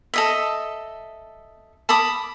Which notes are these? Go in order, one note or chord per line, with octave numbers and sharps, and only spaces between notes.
A4 D#5 E5
A5 B5 D6 D#6